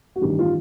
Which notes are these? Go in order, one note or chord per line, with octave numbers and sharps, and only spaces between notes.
F#4
A1 G2 D#3 G4
F4